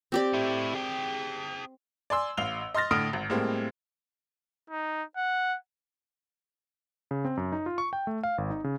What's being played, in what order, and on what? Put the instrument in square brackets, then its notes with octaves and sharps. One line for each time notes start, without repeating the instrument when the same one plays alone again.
[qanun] C4 G4 D5
[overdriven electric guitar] A3 E4
G#4 G5
[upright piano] D5 G#5 C6 E6
A1 F5 F7 G7
D#5 C6 F6 A6 A#6
A2 D3 D#6 F6 D7
G#1
A2 G3 G#3 A#3 C4
[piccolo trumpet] D#4
F#5
[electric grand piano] C#3
C4
F#2
D#4
F4
C#6
G5
A3
F5
G#1
D#4
C#3